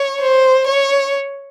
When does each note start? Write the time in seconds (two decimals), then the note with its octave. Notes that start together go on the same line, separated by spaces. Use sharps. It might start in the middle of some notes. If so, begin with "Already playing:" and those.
Already playing: C#5
0.21 C5
0.67 C#5